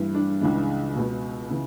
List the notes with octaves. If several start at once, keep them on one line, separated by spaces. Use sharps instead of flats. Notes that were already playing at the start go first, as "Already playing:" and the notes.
Already playing: G2 E3
D4
C#2 C#3 E3 D4
C#2 B2
C#3 E3